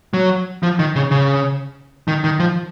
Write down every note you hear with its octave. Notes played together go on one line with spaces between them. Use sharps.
F#3
F3
D#3
C#3
C#3
D#3
D#3
F3